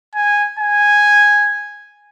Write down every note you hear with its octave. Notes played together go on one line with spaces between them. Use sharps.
G#5
G#5